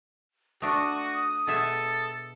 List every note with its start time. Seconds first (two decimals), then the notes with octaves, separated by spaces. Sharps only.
0.62 A3 D4 F#4 D#6
1.47 B2 G#4 A4 E5